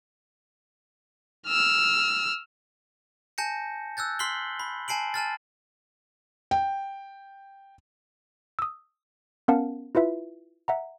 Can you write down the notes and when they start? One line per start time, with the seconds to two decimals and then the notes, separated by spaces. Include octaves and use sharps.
1.47 E6 F6
3.38 G#5 A5 G6 A#6 C#7
3.97 E6 F#6 G6 A6
4.19 C6 F6 B6 C7 F#7 G7
4.60 B5
4.88 G#5 A5 C7 D7 F#7
5.14 G#5 A5 F6 A6
6.51 G5
8.59 D#6 E6
9.48 B3 C#4 A#4 F5 F#5 A5
9.95 E4 F4 B4 E5
10.68 E5 F#5 A#5